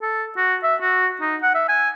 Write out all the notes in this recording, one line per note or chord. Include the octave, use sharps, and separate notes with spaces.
A4
F#4
E5
F#4
D#4
F#5
E5
G#5